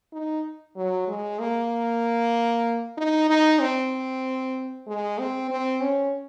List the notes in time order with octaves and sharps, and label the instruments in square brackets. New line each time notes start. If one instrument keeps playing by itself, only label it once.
[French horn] D#4
F#3
G#3
A#3
D#4
D#4
C4
G#3
C4
C4
C#4